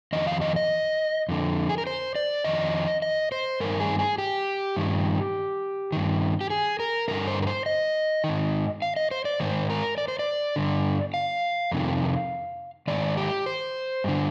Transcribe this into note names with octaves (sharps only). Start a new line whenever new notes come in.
F2 D#3 D#5
F5
D#5
D#5
F2 D3
G#4
A#4
C5
D5
F2 D#3 D#5
D#5
C5
G2 D#3 A#4
G#4
G#4
G4
G2 D#3
G2 D#3
G4
G#4
A#4
G2 D3 A#4
C5
A#4
C5
D#5
D#3
G#2
F5
D#5
C5
D5
G#2 D#3 C5
A#4
D5
C5
D5
G2 D3
F5
F2 C3 D#3
G#2 D#3 D5
G4
C5
G2 D3